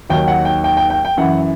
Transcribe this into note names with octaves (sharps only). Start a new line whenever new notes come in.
D#2 D#3 F#3 G5
F#5
G5
G5
G5
G5
G5
F#2 E3 F#5